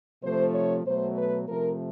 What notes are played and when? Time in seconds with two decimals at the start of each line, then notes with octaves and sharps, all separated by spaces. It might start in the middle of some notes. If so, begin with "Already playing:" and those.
0.23 C3 F3 A3 C5
0.54 C#5
0.85 B2 F#3 A3 C5
1.17 B4
1.48 C3 F3 A3 A#4